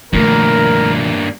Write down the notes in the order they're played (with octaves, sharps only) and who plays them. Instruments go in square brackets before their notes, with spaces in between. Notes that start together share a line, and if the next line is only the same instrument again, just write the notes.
[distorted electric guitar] G2 A#3 [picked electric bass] B2 D#3 F3 [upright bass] G3 A3 [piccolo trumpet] A#4